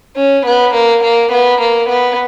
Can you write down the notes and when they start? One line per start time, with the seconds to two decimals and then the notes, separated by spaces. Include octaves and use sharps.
0.16 C#4
0.46 B3
0.74 A#3
1.03 A#3
1.32 B3
1.61 A#3
1.89 B3